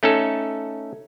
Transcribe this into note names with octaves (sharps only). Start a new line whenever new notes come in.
A3 C#4 D#4 A4